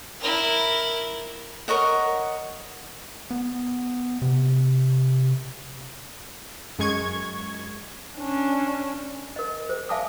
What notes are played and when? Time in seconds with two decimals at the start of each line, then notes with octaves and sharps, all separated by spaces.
0.21 E4 A#4
1.68 A#4 C#5 D#5 F#5
3.31 B3
4.22 C3
6.79 F#2 G#3 C#6 G#6
8.18 C#4 D4
9.36 A#4 D#5
9.69 G#4 C5
9.89 E5 F5 G#5 A5 D6 D#6